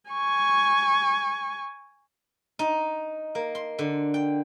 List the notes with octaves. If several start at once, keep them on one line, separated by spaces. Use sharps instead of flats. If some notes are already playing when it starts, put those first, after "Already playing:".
G#5 C#6
D#4
A#3
C6
D3
G5